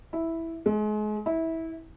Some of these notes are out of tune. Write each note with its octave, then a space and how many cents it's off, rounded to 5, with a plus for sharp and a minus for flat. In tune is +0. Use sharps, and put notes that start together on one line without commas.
E4 -5
G#3 +35
E4 -20